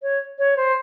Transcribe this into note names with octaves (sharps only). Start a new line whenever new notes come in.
C#5
C#5
C5